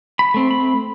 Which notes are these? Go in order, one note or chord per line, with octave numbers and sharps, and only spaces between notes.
B5
A3 C4
B5